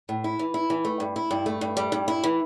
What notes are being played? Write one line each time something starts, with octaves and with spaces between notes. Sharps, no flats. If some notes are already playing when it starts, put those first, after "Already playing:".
A2
E4
E3
E4
E3
A3
G2
E4
G2
A3
G2
G3
G2
E4
E3